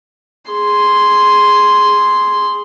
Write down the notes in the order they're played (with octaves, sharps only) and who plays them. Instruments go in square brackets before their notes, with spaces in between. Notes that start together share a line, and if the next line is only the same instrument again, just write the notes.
[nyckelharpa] G#4 C6